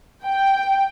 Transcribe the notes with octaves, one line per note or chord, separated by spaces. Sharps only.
G5